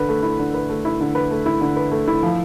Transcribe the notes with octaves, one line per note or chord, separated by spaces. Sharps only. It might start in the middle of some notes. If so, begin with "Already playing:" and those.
Already playing: D3 B4
A3
E4
D3
B4
A3
E4
D3
B4
A3
E4
D3
B4
A3
E4
F3